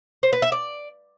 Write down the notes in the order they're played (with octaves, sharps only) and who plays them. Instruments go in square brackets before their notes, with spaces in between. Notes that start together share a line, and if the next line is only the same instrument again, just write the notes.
[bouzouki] C5
B4
E5
D5